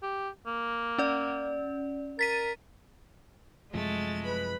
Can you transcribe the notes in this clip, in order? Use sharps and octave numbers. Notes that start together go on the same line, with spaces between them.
G4
A#3
C#4 D5
A#4 A6 B6 D#7
F#2 C3 F3 G#3 A3 A6
B4 B5